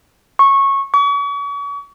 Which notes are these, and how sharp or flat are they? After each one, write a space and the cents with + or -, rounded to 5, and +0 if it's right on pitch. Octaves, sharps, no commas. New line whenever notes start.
C#6 -15
C#6 +40